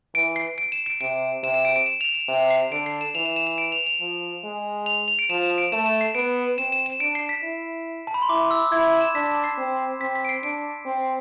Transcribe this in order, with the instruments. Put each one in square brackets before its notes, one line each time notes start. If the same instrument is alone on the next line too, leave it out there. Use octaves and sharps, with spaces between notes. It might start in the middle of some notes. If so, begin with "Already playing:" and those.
[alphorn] E3 [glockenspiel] D7
[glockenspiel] C7
D7
E7
D7
[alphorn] C3 [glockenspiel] D7
[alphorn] C3 [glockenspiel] E7
[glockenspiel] E7
D7
D7
E7
F7
D7
E7
[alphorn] C3
[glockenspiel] C7
[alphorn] D3 [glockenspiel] D7
[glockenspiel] C7
E7
[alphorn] E3 [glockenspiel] F7
[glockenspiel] E7
E7
E7
D7
F7
F7
[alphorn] F3
G#3
[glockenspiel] F7
F7
D7
[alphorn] F3 [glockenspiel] E7
[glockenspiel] E7
D7
[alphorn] A3 [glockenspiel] E7
[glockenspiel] E7
C7
[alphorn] B3 [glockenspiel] D7
[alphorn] C4 [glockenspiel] E7
[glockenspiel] E7
E7
[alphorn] D4 [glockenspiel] D7
[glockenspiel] C7
B6
[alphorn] E4
[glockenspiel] A5
B5
C6
[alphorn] E4 [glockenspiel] D6
[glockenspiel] E6
[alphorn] E4 [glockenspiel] G#6
[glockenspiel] E7
[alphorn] D4 [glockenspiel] B6
[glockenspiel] C7
[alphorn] C4
[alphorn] C4 [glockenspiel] B6
[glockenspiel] B6
D7
C7
[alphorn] D4 [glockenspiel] D7
[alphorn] C4